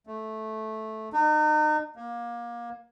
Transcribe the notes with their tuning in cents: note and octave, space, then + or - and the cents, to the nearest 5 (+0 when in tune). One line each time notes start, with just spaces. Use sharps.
A3 -10
D#4 -35
A#3 +25